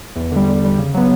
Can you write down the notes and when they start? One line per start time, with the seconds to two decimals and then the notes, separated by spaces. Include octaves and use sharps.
0.16 E2
0.31 D3 G3
0.48 E2
0.63 D3 G3
0.79 C#3
0.94 F#3 B3